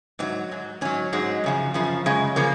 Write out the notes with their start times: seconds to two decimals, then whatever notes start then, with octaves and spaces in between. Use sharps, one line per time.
0.19 G#2 F#3 C4
0.51 G#2 F#3
0.81 G#2 F#3 C#4
1.13 G#2 F#3 G#3
1.44 F#2 C#3 F3
1.74 F#2 C#3 F3
2.06 F#2 C#3 G#3
2.36 C#3 F3 A#3